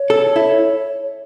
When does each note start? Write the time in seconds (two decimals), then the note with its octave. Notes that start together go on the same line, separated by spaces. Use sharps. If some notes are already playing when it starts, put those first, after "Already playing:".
Already playing: C#5
0.10 A4
0.36 E4